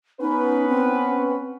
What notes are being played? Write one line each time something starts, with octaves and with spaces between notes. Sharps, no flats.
B3 C#4 D#4 B4
C4